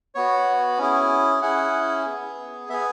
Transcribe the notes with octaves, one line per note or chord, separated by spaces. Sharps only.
B3 F#4 C#5
C#4 E4 G#4
C#4 E4 G#4 F#5
B3 G#4
B3 G#4 E5